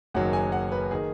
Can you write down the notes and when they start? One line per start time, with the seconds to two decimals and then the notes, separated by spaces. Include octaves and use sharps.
0.14 F#1 F#2 D#3 F#3 F#5
0.33 G#5
0.52 F#5
0.72 B4
0.91 D#3 G#4